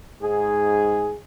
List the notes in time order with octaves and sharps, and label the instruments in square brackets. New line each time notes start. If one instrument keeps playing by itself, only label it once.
[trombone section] G#2 G#4